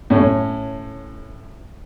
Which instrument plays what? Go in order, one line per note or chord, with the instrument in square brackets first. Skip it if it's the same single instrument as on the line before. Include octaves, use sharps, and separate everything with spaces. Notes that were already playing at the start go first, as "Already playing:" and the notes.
[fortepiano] A2 C#4